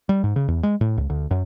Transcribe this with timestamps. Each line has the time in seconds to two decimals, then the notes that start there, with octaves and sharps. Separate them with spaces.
0.09 G3
0.24 G#2
0.36 C#3
0.48 E2
0.63 G#3
0.81 A2
0.98 C#2
1.10 D2
1.31 F#2